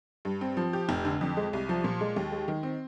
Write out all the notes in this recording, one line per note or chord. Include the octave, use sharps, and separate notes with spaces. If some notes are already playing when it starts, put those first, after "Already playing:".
G2
C4
F3
G4
F1
D3
F2
G#3
C2
F3
A#2
G#3
D#2
G#3
D#3
C4